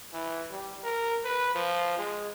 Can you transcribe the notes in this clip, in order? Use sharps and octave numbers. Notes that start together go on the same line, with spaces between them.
E3
G3
A#4
B4
F3
G#3